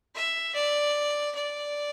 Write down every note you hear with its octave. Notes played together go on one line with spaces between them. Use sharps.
E5
D5
D5